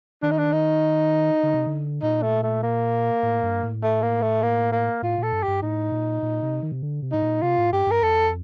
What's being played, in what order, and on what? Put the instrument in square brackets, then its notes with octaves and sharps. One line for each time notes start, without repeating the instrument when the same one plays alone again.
[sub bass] D#3 [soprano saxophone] D4
[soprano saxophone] D#4
D4
D#4
[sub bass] D3
C3
D3
[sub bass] A#2 [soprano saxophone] D#4
[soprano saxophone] A3
A3
A#3
[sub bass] A2
G2
A2
[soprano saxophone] A3
A#3
A3
A#3
A#3
[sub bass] A2 [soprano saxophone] F4
[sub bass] A#2 [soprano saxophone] A4
[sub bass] G2
[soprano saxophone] G4
[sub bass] G2
[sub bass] A2 [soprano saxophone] D#4
[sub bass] A#2
A#2
C3
D#3
C3
D3
C3
[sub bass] A2 [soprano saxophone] D#4
[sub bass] A#2
[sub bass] C3 [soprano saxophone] F4
[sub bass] A2
[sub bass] G2 [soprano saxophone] G4
[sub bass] G2 [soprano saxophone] A#4
[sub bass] F2 [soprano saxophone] A4